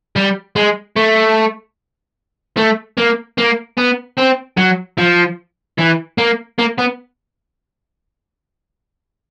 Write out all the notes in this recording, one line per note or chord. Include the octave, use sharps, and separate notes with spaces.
G3
G#3
A3
A3
A#3
A#3
B3
C4
F#3
F3
E3
A#3
A#3
B3